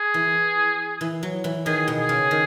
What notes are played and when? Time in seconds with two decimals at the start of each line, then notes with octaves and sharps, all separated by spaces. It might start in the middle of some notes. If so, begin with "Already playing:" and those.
Already playing: G#4
0.14 E3
1.01 E3
1.23 F#3
1.44 E3
1.66 D#3 G#4
1.88 B2
1.99 G#4
2.09 C#3
2.31 D#3